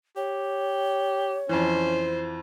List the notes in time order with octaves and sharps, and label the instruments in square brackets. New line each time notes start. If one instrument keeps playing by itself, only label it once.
[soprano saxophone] G4 [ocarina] C#5
[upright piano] F2 E3 [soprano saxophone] C#4 [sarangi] C5